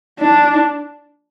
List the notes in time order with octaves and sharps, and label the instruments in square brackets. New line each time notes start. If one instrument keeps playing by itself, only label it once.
[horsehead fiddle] D4